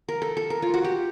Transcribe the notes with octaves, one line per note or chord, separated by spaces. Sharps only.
A#4
A4
A4
A#4
F4
F#4
G4